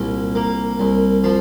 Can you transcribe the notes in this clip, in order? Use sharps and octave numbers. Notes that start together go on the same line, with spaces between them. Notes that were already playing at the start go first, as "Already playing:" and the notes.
Already playing: C2 A#2
A#3
C2
F3 C6